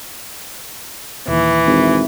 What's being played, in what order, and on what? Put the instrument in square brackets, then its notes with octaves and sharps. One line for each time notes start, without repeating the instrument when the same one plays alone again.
[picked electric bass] D#1 D#2 [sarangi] E3
[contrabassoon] G#1